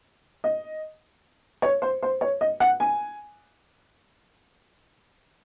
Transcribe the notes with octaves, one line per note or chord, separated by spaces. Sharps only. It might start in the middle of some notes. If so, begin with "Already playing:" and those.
D#5
C#5
C5
C5
C#5
D#5
F#5
G#5